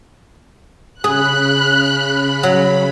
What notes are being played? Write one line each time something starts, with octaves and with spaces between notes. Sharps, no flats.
C#3 G#4 B5 F#6
F#3